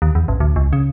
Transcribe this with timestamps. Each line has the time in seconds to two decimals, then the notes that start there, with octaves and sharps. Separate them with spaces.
0.02 D#2
0.15 E2
0.28 A1
0.40 D2
0.56 C#2
0.73 C#3